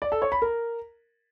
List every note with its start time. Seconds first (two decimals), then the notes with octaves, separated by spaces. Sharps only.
0.02 D5
0.12 A4
0.22 C#5
0.32 B5
0.42 A#4